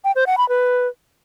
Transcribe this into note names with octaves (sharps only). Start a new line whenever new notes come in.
G5
C5
F#5
B5
B4